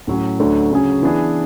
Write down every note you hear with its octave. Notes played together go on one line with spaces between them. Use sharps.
A2 F#3 C#4
D2 D3 F#3 A3 D4
C#3 F#3 C#4 G#4
E3 B3 D4 G#4